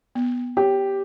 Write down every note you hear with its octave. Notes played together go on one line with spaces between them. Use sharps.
B3
G4 C#5